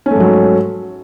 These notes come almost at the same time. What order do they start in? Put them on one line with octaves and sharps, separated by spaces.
C#4 A3 G#2 F#3